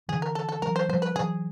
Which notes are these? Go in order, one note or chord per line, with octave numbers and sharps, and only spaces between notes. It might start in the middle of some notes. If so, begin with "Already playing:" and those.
D3 E3 G#4
A#4
A4
A4
E3 F#3 A#4
C5
F3 G3 C5
B4
E3 F#3 G#4